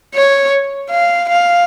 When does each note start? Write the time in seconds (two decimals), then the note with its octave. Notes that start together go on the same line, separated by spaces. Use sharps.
0.15 C#5
0.91 F5
1.29 F5